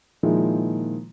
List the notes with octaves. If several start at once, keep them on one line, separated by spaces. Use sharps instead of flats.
A#2 D#3 F3 G#3 E4